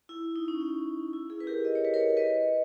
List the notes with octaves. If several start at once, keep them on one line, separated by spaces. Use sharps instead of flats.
E4
D#4
C#4
D#4
E4
E4 G#4
B4
G4 A#4
D#5
C#5
B4
A#4 C#5
B4 D#5